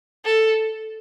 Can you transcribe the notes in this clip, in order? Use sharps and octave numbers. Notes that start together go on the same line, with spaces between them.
A4